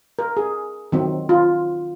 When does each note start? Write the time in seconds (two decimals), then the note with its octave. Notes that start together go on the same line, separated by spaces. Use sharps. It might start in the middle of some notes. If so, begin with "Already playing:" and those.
0.19 A#4
0.37 G#4
0.92 D#3 F#3 C4
1.29 F4